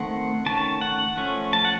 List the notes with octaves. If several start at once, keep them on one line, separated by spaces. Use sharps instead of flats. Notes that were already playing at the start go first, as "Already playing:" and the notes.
Already playing: D#3 A3 C4 F#5
D#3 A3 C#4 A5
F#5
F3 A3 C#4
A5
F#5